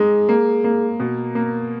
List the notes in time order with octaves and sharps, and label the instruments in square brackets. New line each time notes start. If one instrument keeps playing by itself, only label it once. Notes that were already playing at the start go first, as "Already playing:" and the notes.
Already playing: [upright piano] G#3 D#4 [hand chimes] G#4
[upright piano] A#3
A#3
B2
A#3